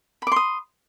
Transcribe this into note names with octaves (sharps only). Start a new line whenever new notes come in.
B5 C6 D6 D#6